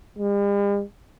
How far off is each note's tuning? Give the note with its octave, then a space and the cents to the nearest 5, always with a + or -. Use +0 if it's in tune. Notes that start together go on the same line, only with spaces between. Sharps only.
G3 +45